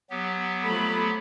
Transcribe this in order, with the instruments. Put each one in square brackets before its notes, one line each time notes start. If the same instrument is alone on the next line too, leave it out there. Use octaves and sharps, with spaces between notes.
[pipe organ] F#3 B3 G4
[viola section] F3 A3 B5